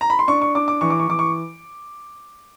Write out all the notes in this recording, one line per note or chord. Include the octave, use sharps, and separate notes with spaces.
A#5
B5
C6
D4 C#6
C#6
D4 D6
D6
E3 C#6
D6
C#6
E3 D6
C#6